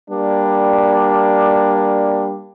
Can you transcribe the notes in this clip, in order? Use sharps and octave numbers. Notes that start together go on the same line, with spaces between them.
G3 A#3 D4